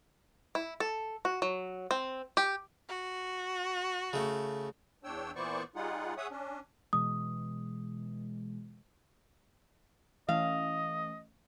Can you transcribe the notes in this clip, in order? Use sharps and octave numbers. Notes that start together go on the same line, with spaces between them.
E4
A4
F#4
F#3
C4
G4
F#4
C#3 A3
E2 D4 C#5 G5 E6
A#2 E3 B3 C5 D5 C#6
G3 D#4 F4 G#4 F#5
G#4 C#5 E5 F#5 D#6
C#4 D4
B2 E3 G#3 D#6
E3 A3 C#4 D#5 F5